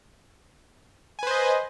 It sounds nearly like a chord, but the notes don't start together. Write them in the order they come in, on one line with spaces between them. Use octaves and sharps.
G#5 B4 C5 D#5